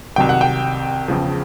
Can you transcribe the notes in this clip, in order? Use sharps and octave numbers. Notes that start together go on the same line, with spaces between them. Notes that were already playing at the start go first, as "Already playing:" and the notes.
C2 C3 D#3 F#3 G5
F#5
G5
E1 E2 C#3 F3